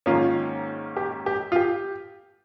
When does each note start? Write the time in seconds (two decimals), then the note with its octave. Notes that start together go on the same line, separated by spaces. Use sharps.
0.06 G#2 D#3 A#3 C#4 F4
0.97 G4
1.26 G4
1.52 F4
1.56 G4